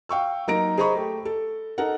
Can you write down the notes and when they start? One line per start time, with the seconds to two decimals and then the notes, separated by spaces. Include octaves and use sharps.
0.09 F5 G5 C#6 E6
0.47 F#3 A#3 D#4 A#5 A#6 D7
0.77 G#4 C5 D#5 A#5 B5 C#6
0.95 A3 G4
1.25 A4
1.78 D#4 A4 A#4 F#5